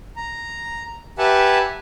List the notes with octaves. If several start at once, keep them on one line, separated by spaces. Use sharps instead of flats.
A#5
G4 B4 E5 F#5 G#5 A5